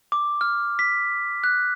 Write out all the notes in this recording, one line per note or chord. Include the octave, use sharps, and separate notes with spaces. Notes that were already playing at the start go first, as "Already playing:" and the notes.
D6
F6
B6
F#6